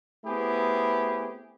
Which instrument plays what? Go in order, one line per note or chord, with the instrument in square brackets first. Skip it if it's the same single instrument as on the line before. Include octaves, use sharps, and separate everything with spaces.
[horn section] A3 B3 C4 E4 G4 G#4